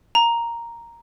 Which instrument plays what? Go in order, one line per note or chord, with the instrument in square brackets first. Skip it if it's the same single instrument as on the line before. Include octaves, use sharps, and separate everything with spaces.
[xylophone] A#5